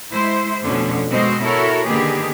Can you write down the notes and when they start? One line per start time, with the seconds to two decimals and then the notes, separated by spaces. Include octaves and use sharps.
0.11 G#3 E4 C5
0.62 F2 B2 D3 F3 A3 C#4
1.11 B2 G#3 C4 F#4 C5 D#5
1.44 E4 F#4 A4 A#4 C#5
1.86 D3 D#3 A#3 B3 G4 G#4